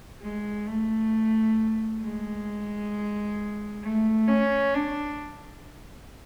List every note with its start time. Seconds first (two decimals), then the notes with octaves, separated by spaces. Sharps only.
0.22 G#3
0.67 A3
2.02 G#3
3.83 A3
4.28 C#4
4.74 D4